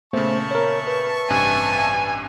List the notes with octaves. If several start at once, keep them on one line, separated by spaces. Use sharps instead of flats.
A#2 C#3 A3 B3 C5 E5 A5 C#6
A#4 C#5
B4
A1 G2 C3 G#5